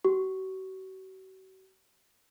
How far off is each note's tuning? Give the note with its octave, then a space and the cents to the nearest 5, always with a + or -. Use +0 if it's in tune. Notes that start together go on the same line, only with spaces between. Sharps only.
F#4 +40 C#6 +0